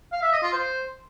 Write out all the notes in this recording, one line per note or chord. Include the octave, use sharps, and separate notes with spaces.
F5
E5
D#5
F4
C5